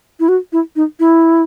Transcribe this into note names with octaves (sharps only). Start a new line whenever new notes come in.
E4
F#4
E4
D#4
E4